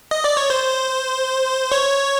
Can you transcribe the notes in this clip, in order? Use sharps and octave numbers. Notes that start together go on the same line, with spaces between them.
D#5
D5
C#5
C5
C#5